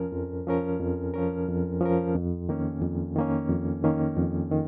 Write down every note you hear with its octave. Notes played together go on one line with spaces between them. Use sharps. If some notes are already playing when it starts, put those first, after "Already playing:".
Already playing: F2 F3 C#4 A#4
F2
F3 C#4 A#4
F2
F3 C#4 A#4
F2
F3 C#4 A#4
F2
D#3 A#3 C#4
F2
D#3 A#3 C#4
F2
D#3 A#3 C#4
F2
D#3